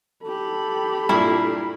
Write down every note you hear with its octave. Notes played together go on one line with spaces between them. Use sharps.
G4 A4 B5
G2 A#2 E4